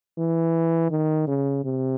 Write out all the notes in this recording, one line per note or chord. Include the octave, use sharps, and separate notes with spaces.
E3
D#3
C#3
C3